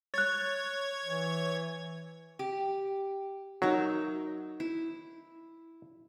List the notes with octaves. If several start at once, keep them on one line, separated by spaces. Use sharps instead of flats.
C#5 F#6 G#6 A6
E3
G4
F#3 D#4 A#4 E5
E4